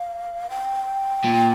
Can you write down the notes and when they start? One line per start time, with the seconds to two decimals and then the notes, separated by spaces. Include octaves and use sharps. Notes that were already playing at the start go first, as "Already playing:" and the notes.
Already playing: F5
0.50 G5
1.25 A#2